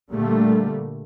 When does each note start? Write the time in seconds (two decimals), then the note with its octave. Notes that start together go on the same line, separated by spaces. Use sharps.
0.10 A#2 D3 G3 A3 A#3